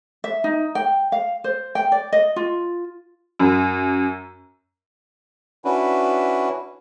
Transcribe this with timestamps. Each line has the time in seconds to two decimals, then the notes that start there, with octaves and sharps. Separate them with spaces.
0.24 E5
0.44 D#4
0.75 G5
1.12 F5
1.44 C5
1.75 G5
1.92 D5
2.13 D#5
2.36 F4
3.39 F#2
5.65 C#4 D4 E4 F#4 B4